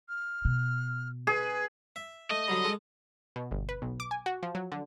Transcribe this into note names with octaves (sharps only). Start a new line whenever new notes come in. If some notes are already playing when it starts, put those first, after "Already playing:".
F6
B2
G#4 B4
E5
A3 D#5
D3 F#3 G3
G#3 A4
B2
G1
B4
B1
D6
G#5
F#4
F3
F#3
D3